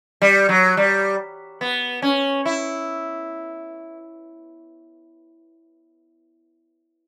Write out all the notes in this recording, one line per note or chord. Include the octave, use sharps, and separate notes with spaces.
G3
F#3
G3
B3
C#4
E4